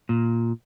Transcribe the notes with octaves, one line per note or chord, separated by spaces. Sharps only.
A#2